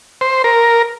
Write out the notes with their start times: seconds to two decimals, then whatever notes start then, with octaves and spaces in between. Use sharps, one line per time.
0.21 C5
0.44 A#4